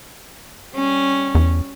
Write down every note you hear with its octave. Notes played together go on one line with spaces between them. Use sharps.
G3 C#4
E2